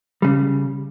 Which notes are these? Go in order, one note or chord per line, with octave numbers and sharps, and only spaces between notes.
C#3 G3